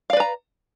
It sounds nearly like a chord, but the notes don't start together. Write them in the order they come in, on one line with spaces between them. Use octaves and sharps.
F5 D5 B4 A#5